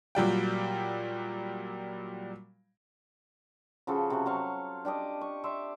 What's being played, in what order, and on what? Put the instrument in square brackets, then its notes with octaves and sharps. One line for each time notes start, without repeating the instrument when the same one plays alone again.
[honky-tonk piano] A#2 F#3 G3 G5
[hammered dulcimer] C#3 F3 F#4 A4
C3 F#4
F#3 C5 F5 C#6
D4 G4 D5 D#5
C#6
D5 E5 C6